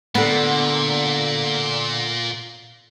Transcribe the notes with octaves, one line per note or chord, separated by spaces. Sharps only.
A#2 D3 B3